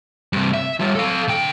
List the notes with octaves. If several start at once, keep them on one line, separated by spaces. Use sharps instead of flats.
G2 C3
E5
G3 F4
A4 F5
D3 G5